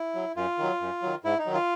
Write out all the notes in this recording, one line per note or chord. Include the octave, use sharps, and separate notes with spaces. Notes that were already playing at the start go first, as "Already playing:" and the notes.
Already playing: E4
F#3
F#2 F4
D#3 F#3
F#2
D#3 F#3
G#2 E4
D#4
D#3 F#3
F4